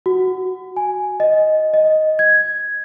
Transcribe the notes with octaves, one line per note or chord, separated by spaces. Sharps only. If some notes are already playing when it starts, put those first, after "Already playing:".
F#4
G#5
D#5
D#5
G#6